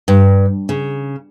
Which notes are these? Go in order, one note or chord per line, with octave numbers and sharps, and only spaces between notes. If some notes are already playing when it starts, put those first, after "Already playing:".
G2
C#3